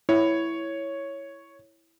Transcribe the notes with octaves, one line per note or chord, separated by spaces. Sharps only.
E4 C#5